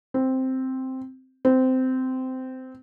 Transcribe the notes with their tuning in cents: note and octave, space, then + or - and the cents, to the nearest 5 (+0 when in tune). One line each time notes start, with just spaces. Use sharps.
C4 +0
C4 -15